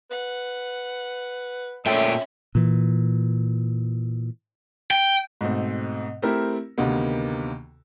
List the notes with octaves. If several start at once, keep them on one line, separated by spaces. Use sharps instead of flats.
B4 F#5
A#2 G#3 A3 C#4 E5 G5
A#2 E3
G5
G#2 B2 A3 C4
A3 C4 E4 G4 A#4
D2 C3 D#3 A#3 B3